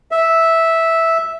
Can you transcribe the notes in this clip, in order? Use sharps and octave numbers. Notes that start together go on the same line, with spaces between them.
E5